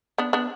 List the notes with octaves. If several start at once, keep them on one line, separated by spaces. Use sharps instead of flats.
B3 D4
B3 D4